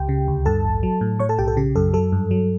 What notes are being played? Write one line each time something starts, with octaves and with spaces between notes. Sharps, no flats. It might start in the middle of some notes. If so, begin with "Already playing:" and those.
Already playing: C#2 G4 G5
C#3
D2
G2 A4 A5
A1
F#3
A2
A2 C#5 C#6
A4 A5
B1 G4 G5
A4
C#3 G4
F#2 A4
F#3 A4
G2
F#3